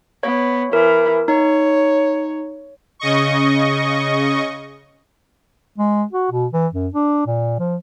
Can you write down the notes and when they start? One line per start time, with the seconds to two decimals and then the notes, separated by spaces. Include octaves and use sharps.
0.23 B3 C#5
0.73 E3 A#4
1.28 D#4 C#5
2.99 C#3 D#5 C#6
5.79 G#3
6.13 F#4
6.32 B2
6.53 E3
6.74 F#2
6.94 D4
7.27 A#2
7.59 F3